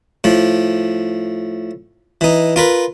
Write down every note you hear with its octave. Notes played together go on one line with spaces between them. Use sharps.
A2 F3
E3 D#4
F4 A#4 B4